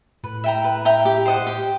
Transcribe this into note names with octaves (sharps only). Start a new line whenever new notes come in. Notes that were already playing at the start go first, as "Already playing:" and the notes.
A2 B4
E5 G5 A#5
B4
E5 G5 A#5
G4
C5 D#5 F#5
G4